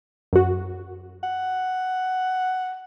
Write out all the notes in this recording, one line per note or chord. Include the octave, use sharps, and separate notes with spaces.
F#2 F#4
F#5